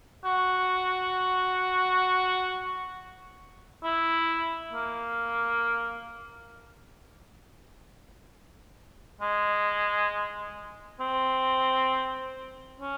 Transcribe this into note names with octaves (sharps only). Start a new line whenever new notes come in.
F#4
E4
A#3
G#3
C4
C#4